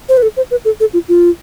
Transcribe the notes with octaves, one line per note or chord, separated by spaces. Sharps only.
C5
B4
A4
C5
B4
A4
A4
F4
F4